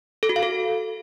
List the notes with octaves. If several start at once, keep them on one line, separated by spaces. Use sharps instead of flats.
A4
F#4
F5
A4